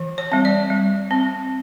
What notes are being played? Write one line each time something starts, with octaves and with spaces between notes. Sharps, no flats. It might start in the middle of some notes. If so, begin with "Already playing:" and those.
Already playing: E3
C#5
G3 C4
D5
G3
C4